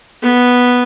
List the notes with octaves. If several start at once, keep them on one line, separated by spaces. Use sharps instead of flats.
B3